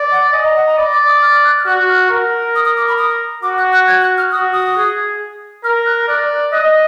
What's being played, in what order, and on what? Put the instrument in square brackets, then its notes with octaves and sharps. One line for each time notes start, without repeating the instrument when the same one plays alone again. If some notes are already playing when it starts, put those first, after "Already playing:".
Already playing: [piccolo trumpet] D5
[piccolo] F#5
[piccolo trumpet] D#5 [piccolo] G#5
[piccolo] A#5
F#5
A#5
[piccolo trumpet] D5 [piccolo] B5
[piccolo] D6
D#6
F6
F#6
F6
[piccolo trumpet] F#4 [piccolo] F#6
[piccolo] F6
[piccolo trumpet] A#4
[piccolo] D#6
D#6
D6
B5
D#6
[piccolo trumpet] F#4 [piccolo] D6
[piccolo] F#6
F#6
G#6
F#6
F6
[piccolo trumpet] F#4 [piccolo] D#6
[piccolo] D#6
[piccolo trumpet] G#4
[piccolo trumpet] A#4 [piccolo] F6
[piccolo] F#6
[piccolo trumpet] D5 [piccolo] F#6
[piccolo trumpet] D#5 [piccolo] F#6